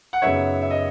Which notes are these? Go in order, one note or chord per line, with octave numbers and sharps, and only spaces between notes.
F#5
F#2 C#3 F#3 B3 D#4 C#5 E5
E5
D#5